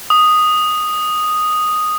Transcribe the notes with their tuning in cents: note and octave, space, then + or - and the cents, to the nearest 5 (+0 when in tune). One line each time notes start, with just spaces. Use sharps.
D#6 -5